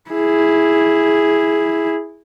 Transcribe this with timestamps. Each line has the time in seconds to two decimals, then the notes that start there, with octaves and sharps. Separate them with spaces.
0.11 E4 G#4